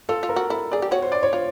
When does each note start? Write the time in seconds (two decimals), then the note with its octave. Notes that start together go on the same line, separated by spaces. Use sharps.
0.09 F4 A4
0.23 F4
0.29 A#4
0.36 F#4
0.50 E4 A4
0.71 G#4 D5
0.82 G4
0.91 F#4 C#5
1.02 C5
1.12 D5
1.23 C#5
1.33 F4 C5